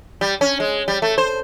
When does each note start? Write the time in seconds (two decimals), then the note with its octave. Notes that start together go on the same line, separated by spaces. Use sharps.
0.21 G3
0.41 C#4
0.60 G#3
0.88 G3
1.02 A3
1.18 C5